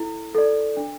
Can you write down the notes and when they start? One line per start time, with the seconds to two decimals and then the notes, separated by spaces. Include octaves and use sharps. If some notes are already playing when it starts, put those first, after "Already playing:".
Already playing: E4 A4
0.35 A4 D5
0.77 D4